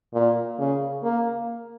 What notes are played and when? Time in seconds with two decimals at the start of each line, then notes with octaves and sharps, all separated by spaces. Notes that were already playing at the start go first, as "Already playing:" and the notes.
0.14 A#2
0.59 C#3
1.03 A#3